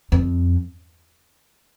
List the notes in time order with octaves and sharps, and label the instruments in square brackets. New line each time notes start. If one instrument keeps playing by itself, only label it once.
[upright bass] F2